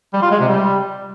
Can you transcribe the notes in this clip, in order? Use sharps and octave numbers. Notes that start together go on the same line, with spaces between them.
G3
F4
G#3
C3
G3